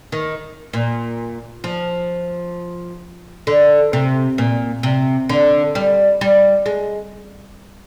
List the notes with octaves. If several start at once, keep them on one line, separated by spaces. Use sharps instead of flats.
D#3
A#2
F3
D3
C3
A#2
C3
D3
G3
G3
G#3